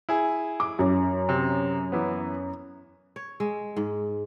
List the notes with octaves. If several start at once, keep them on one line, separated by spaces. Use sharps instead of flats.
E4 G#4
D6
F#2
C3
E3 B3
C#5
G#3
G#2